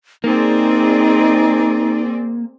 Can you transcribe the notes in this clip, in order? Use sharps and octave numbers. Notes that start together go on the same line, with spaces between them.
A#3 C4 D#4 G#4 D5